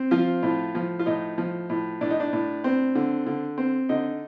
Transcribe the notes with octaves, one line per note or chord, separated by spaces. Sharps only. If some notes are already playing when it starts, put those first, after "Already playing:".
Already playing: C4
F3 F4
A2
F3
F4
A2 D#4
F3
A2
A2 D4
D#4
D4
A2
C4
D3
D3
C4
D3 D#4